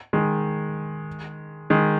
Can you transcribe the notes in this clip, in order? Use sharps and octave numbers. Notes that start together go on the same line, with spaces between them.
D#3 G#3
D#3 G#3